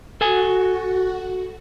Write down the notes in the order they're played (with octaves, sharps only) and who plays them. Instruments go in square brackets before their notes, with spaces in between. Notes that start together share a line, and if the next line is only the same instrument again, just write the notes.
[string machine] F#4 [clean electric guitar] A4 G#5